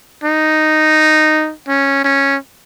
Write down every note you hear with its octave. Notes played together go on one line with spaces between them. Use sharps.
D#4
C#4
C#4